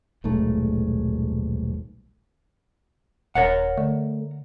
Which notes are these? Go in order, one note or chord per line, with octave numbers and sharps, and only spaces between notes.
D#1 B1 G#2 A3
D#1 A#4 C#5 F#5
D3 A3